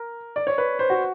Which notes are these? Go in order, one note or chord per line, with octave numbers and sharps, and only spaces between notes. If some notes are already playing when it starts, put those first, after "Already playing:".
Already playing: A#4
D5
C#5
B4
C5
F#4